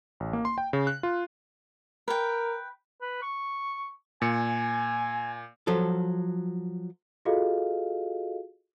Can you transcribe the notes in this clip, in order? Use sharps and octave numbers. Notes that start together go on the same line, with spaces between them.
A1
A#3
C6
G5
C#3
F#6
F4
A#4 B4 G5
B4
C#6
A#2 G#5 C#7
F3 F#3 A4
F4 F#4 G#4 A4 D#5 F5